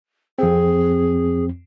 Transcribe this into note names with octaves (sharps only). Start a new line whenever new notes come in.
F2 C4 G#4